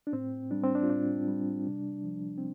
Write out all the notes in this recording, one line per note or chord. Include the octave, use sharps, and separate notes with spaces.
D4
A2 C4
G3 D4
C4
D4
F4
A2 D4
G3
C3
F3
C4